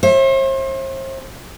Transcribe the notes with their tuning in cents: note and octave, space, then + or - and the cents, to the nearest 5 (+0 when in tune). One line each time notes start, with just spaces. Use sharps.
C5 +40 E5 +0